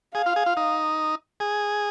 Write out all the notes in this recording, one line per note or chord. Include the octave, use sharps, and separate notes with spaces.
G#4 F5
F4
G#4
F4
D#4
G#4